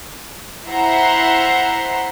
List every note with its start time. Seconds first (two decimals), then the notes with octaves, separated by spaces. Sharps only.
0.67 E4 C5 E5 F#5 A#5 C6